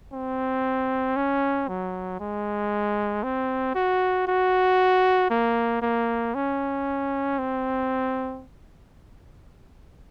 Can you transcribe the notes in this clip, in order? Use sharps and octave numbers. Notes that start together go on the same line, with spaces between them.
C4
C#4
F#3
G#3
C4
F#4
F#4
A#3
A#3
C#4
C4